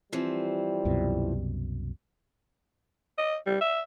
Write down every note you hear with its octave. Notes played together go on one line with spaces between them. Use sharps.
E3 F3 G3 C4
C2 F#2 B2
D#5
G3
E5